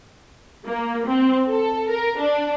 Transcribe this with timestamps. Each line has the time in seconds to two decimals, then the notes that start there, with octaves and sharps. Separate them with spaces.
0.66 A#3
1.07 C4
1.50 A4
1.90 A#4
2.20 D4